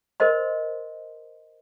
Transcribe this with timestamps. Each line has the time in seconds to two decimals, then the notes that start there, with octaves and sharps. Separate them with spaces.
0.20 A#4 C5 D#5 C6